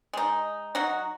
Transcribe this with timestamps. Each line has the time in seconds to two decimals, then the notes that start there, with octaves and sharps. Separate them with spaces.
0.13 G#3 D#4
0.75 F#3 D#4 F#4